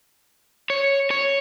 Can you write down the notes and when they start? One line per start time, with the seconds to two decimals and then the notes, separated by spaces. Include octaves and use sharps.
0.70 C#5
1.11 C#5